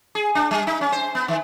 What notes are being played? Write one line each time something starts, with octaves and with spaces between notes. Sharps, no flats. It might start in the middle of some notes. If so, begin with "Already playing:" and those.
G#4
D4
G3
D#4
C#4
C5
B3
D#3